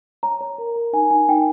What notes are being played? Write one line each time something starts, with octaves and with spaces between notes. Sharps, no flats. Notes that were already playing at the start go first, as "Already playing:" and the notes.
C#5 A#5
C#5
A#4
A#4
D#4 G#5
D#4 G#5
D#4 G5